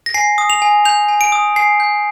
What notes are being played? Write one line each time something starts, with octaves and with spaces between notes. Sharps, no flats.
A#6
G#5 C7
D#6
F7
G#5
G6 F7
G#5
D7
D#6
G#5 C7
G6